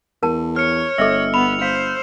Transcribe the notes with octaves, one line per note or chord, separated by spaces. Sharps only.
E2 A#4 A5
C#5 F6 C#7
G1 A4 D#5 E5 E6
B3 B5 F7
C5 F5